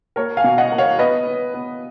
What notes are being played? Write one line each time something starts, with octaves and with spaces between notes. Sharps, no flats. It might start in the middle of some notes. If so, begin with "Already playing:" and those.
A#3 A#4 C#5
F5 G#5
B2
D#5 F#5
A#3
C#5 F5
B3 B4 D#5
B3
B3